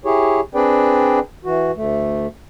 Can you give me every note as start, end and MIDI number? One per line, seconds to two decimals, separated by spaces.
0.05 0.40 64
0.05 0.40 67
0.05 0.40 68
0.05 0.40 73
0.55 1.19 60
0.55 1.19 62
0.55 1.19 68
0.55 1.19 71
0.55 1.19 74
0.55 1.19 79
1.45 1.71 52
1.45 1.71 66
1.76 2.27 38
1.76 2.27 57